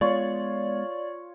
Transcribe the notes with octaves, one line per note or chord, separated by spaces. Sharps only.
G#3 B3 F4 C#5 D5